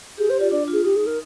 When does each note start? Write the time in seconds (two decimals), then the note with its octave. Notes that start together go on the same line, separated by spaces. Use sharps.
0.18 G4 G#4
0.29 G4 C5
0.40 F4 D5
0.51 D4 D5
0.68 F4 G#4
0.84 D#4 G4
0.96 G#4
1.06 A#4